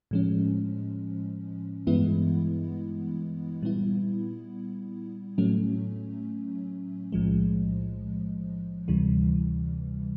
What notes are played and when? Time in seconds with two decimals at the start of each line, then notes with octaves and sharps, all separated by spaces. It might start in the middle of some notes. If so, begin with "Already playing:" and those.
0.11 A2 F3 G#3 C#4
1.87 G2 E3 G#3 B3 E4
3.62 A#2 G3 B3 E4
5.38 A2 F#3 A3 C#4
7.12 B1 A2 F3 G#3
8.88 D2 C3 E3 G3